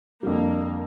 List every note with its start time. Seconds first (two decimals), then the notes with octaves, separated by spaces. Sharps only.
0.23 F2 D3 G3 A#3